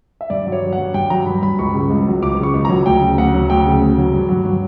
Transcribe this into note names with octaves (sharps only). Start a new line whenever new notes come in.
E5
G2 D5
F#3
C#5
F#3
F#5
G2
G2 G5
F#3 A#5
F#3 B5
G2 B5
C#2 C#6
C#3
C#2
F#3
C#2 D6
C#3
C#6
C#2
F#3 A#5
D2 G5
C#3
D2 F#5
F#3
D2 G5
C#3
D2
F#3
G2
F#3
F#3